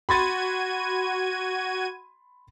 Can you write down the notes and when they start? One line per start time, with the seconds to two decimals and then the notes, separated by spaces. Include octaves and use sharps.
0.09 F#4 B5 C6 G#6 A6 D#7